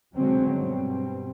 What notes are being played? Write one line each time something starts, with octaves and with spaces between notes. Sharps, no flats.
B2 D3 F#3 G#3 C4 C#4
G2 B2 C4